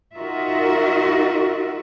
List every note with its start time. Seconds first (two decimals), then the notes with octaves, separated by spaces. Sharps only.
0.15 D#4 F4 F#4 A#4 D#5 E5